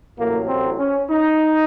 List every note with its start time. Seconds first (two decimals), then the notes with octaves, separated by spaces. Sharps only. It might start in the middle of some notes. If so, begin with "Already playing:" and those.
0.17 A1 A2 F#3 A#3
0.48 C4
0.78 C#4
1.09 D#4